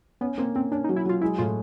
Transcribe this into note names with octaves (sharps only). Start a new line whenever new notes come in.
B3 C#4
A#3 C4
C4 C#4
C#4 D4
D#4
F#3
E4
F#3 F4
G#3 E4
A2 F4